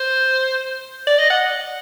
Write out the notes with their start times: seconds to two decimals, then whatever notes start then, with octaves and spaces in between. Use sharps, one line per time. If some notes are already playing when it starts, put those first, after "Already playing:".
Already playing: C5
1.07 D5
1.18 D#5
1.30 F#5